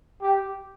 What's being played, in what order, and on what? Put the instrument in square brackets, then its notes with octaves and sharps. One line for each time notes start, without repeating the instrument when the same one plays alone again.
[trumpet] G4